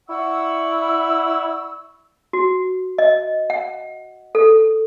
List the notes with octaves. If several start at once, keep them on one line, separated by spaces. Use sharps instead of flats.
E4 D5 F#5 C#6 E6
F#4
D#5
F#5
A4